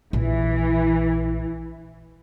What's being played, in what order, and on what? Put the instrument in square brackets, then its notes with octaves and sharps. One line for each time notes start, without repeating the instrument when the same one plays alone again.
[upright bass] A#1 [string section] E3